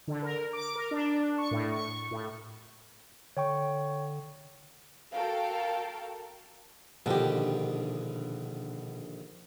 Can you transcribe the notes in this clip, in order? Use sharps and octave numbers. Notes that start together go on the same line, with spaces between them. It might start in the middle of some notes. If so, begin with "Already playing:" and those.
D3
A#4
D6
A#4
D4
C#6
A2
C#6
A2
D3 C#5 G5 C#6
F#4 A4 A#4 F5 G5
A#1 B2 D3 D#3 G4